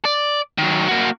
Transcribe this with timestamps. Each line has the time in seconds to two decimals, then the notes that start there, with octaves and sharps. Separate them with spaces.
0.05 D5
0.58 D#3 F#3
0.88 A#3 F#4